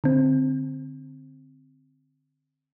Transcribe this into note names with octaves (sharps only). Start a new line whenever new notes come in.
D3 C4